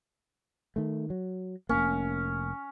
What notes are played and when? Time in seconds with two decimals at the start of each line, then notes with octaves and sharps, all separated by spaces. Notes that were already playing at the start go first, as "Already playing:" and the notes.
0.76 D#3 A3
1.10 F#3
1.69 F1 F2 A#3 C#4